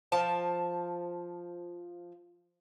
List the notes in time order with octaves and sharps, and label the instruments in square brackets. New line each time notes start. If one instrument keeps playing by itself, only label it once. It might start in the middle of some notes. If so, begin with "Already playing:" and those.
[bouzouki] F3 G5 A5